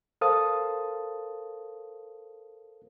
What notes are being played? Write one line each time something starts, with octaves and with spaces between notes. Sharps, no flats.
A4 A#4 C5 F5 A5 D#6